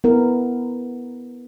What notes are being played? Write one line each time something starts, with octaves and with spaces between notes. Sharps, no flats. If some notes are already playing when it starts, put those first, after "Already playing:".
B3 E4 A#4